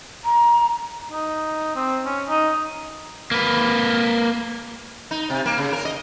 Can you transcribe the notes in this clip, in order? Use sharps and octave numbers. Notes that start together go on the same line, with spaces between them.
A#5
D#4
C4
C#4
D#4
A#3 B4
D#4
C3
A#3
C#3
A#4
D#5